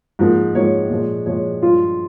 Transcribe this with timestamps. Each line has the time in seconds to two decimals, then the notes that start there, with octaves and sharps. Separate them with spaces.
0.19 G#2 F3 A#3
0.55 G#2 F3 A#3 C#5
0.90 A#2 F3 G#3
1.26 A#2 F3 G#3 C#5
1.62 G2 F3 G#3 F4